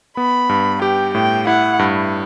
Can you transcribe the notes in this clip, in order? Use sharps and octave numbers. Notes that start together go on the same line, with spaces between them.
B3 B5
G2
G4 G5
A2 G5
E4 F#5
G2